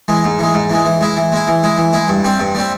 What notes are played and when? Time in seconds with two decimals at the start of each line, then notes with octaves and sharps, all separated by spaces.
0.08 E3 G#3
0.24 G#2
0.39 E3 G#3
0.54 G#2
0.70 E3 G#3
0.85 E3
1.01 G#3 E4
1.17 E3
1.32 G#3 E4
1.48 E3
1.63 G#3 E4
1.78 E3
1.93 G#3 E4
2.08 G2
2.24 G3 C4
2.39 G2
2.55 G3 C4